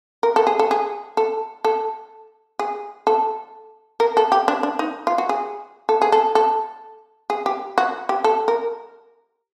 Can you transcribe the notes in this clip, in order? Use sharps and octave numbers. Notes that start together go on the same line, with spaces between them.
A#4
A4
G#4
A4
G#4
A4
A4
G#4
A4
A#4
A4
G4
D4
D4
D#4
F4
F#4
G#4
A4
G#4
A4
A4
G#4
G4
F#4
G4
A4
A#4